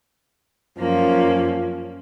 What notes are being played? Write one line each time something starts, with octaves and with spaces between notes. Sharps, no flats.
F#2 F3 A#3 C#4